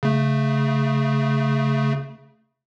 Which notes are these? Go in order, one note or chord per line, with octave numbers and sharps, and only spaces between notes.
C#3 A3